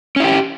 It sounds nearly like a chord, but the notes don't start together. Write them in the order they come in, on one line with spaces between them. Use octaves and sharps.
C#4 E4 G4